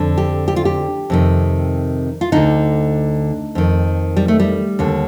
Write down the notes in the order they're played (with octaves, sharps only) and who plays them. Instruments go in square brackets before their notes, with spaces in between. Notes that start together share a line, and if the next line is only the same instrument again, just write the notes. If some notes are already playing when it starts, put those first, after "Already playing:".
Already playing: [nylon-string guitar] F2 D3
G4
G4
F4
G4
F2 C3 D#3
F4
D2 D3 D#4
F2 D#3
G3
A3
G3
D#2 D3